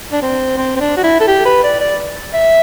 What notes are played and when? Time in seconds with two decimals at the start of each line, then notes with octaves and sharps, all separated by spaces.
0.12 D4
0.22 C4
0.57 C4
0.76 C4
0.80 D4
0.97 F#4
1.04 E4
1.20 A4
1.27 G4
1.45 B4
1.63 D5
1.80 D5
2.33 E5